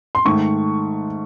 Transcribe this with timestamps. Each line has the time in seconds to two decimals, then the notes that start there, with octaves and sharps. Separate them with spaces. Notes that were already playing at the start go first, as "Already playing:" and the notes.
0.15 C6
0.25 G#2 D#3 A3 C#6